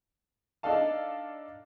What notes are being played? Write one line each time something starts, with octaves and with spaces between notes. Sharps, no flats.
D4 D#4 A4 D#5 F5 A5